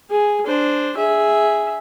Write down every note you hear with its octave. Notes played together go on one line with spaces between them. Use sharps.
G#4
D4 C5
G#4 E5